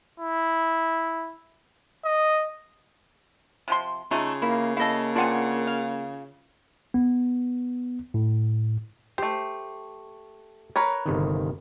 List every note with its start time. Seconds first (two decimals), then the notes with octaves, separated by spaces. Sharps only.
0.20 E4
2.05 D#5
3.68 C3 F3 C6
4.11 C#3 A3 D#4 F4
4.42 A#3 E4
4.77 A#3 E4 A4 D#5 F5
5.16 B3 C4 D4 F4 F#5 G#5
5.67 F5
6.94 B3
8.14 A2
9.18 A3 G4 C5
10.76 A#4 B4 C#5
11.06 G1 C3 D#3